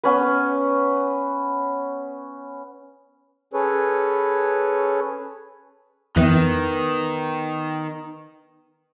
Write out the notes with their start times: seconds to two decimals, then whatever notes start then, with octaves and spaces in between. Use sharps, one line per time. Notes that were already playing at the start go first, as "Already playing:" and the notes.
0.04 B3 C#4 B4
3.54 C#4 G#4 A4 B4 C#5
6.16 F2 D#3 E3 B3